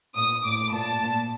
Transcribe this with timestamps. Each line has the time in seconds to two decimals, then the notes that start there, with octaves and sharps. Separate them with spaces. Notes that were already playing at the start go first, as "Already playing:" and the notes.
0.16 A#2 D#6
0.45 A2 D6
0.74 A#2 A5
1.02 A#2